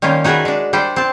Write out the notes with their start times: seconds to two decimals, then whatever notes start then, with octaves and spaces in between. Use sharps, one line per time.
0.02 D#3 G3 A#3 C#4 F4
0.24 D#4 F#4 G#4 A#4 B4 E5
0.45 G#3 D4
0.73 G3 D4 C5 G5
0.96 C4 A5